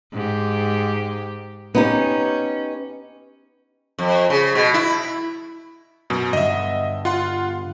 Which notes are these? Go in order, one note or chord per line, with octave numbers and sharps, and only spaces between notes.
G#2 G4
B3 C#4 D#4 G4
F2
C#3
B2
E4
F#2 B2
G2 D3 D#5 E5
F4 F#5 C6